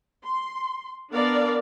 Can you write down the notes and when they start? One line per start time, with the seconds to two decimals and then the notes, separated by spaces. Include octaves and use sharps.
0.25 C6
1.12 B3 D4 A#4 D5 F5